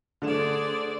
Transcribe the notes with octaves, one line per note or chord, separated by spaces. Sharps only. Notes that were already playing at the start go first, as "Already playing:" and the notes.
D3 A3 G#4 A4 C5 D5 E7